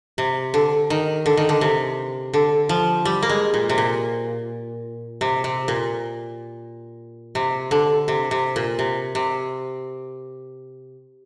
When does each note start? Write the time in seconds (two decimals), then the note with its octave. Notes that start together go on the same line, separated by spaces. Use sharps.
0.18 C3
0.54 D3
0.90 D#3
1.26 D3
1.37 D#3
1.49 D3
1.61 C3
2.33 D3
2.69 F3
3.05 G3
3.22 A#3
3.29 G#3
3.54 A#2
3.69 C3
3.78 A#2
5.21 C3
5.44 C3
5.68 A#2
7.35 C3
7.71 D3
8.08 C3
8.31 C3
8.56 A#2
8.79 C3
9.15 C3